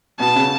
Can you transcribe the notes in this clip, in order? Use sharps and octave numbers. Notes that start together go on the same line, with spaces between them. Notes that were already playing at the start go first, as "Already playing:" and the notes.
B2 B3 A5
C#3 C#4